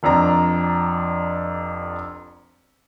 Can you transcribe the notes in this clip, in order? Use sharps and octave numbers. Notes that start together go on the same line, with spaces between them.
F1 F2 D4 A#5